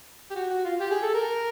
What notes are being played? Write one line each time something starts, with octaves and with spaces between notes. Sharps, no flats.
G4
F#4
F#4
F4
G4
G#4
A4
A#4